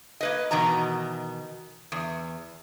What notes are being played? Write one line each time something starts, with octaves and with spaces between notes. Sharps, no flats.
A#3 B4 D#5
B2 D#3 E3 D#5 A#5
E2